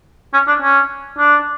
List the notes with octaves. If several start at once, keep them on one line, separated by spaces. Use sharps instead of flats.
C#4
D4
C#4
D4